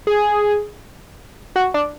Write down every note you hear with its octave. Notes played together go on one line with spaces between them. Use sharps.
G#4
F#4
D4